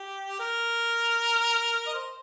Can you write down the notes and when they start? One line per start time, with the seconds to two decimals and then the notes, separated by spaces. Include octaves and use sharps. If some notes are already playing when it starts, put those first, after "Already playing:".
Already playing: G4
0.40 A#4
1.87 D#5
1.94 C5